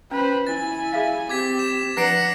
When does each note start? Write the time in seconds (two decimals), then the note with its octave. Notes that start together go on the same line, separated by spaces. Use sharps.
0.11 C#4 B4 C5
0.47 E4 G#5 A6
0.93 G#4 E5 F5
1.29 C4 G4 D6 G#6 B6
1.59 E7
1.97 F3 D4 B4 F#5 A#6 C7 D7